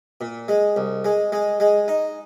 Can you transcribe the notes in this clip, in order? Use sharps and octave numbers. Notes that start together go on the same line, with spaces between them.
A#2
G#3
C2
G#3
G#3
G#3
D#4